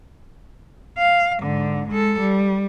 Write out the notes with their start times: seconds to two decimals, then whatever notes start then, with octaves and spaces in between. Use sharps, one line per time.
0.98 F5
1.40 G#2 D3
1.88 G#3 A4
2.19 G3